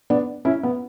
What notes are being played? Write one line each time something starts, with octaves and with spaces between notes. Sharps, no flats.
B3 D4
C#4 E4
B3